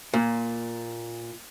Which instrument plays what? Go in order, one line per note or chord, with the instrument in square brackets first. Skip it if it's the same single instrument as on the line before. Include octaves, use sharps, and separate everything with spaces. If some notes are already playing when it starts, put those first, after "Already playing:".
[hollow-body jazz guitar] A#2